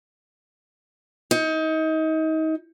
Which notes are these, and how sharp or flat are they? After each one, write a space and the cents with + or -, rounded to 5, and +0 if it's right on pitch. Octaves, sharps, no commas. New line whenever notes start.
D#4 +30